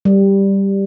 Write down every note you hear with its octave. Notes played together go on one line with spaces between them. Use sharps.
G3